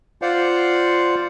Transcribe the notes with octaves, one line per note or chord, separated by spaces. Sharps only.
F4 C5 D5 F5 F#5